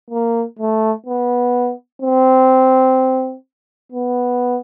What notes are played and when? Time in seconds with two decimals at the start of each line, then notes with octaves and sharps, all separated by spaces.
0.11 A#3
0.59 A3
1.06 B3
2.02 C4
3.92 B3